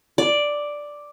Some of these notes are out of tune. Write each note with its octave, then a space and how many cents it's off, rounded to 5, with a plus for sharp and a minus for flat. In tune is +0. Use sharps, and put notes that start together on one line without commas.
D5 +0